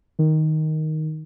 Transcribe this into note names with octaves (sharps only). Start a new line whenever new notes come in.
D#3